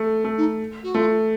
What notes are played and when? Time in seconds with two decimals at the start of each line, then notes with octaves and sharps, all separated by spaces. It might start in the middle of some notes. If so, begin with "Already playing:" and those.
Already playing: A3
0.24 A3
0.37 D#4
0.83 F#4
0.94 A3 F4